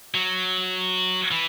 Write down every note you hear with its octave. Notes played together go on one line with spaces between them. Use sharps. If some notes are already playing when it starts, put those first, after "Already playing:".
F#3
E3